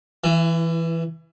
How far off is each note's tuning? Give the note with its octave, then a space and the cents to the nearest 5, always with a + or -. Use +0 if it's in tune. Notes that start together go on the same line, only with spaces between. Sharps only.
E3 +0 E4 +35